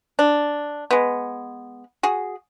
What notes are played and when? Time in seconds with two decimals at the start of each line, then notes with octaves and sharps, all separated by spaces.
0.19 D4
0.91 G#3 B3
2.03 F#4 G#4